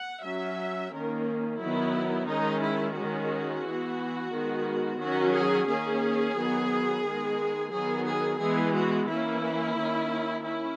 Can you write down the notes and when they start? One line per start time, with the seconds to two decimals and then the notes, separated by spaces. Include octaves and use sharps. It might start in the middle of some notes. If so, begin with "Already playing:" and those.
Already playing: F#5
0.23 F#3 C#4 E5
0.91 D#3 A#3 C#4 A#4
1.60 D#3 F#3 B3 E4
2.28 D#3 G#3 C#4 D#4
2.62 E4
2.96 D#3 G#3 C#4 F#4
3.64 E3 B3
4.32 D#3 G#3 B3
5.00 D#3 F#3 C#4 F#4
5.34 G#4
5.68 D#3 A#3 C#4 G#4
6.36 D#3 F#3 B3
7.05 D#3 G#3 B3
7.72 D#3 F#3 B3 G#4
8.07 G#4
8.40 E3 G#3 B3 G#4
8.75 F#4
9.09 E3 A#3 C#4 E4
9.77 D#3 A#3 C#4
10.45 C#4 E4